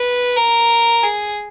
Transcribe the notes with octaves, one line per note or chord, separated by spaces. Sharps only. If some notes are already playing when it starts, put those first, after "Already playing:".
Already playing: B4
A#4
G#4